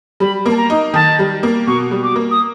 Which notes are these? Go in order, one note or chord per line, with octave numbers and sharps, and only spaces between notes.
G3 B5
A#3
A5
A#5
D#4
D#3 A5
G3
A#3
B2 C#6
G3
D6
A#3
D#6